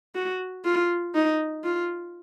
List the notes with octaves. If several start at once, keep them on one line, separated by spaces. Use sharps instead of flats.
F#4
F4
D#4
F4